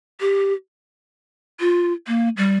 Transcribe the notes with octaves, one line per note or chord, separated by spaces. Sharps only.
G4
F4
A#3
G3